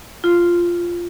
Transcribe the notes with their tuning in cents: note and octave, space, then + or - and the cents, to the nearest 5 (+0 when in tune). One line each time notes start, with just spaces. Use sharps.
F4 -10